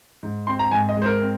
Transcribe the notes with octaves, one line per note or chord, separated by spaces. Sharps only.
G#2
C4 C6
A#5
G#2 G#5
D#5
G#3 C5
A#4
C4